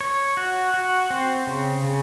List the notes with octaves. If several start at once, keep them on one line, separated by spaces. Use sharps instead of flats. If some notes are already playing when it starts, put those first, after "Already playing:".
C#5
F#4
F#4
C4
C#3
C#3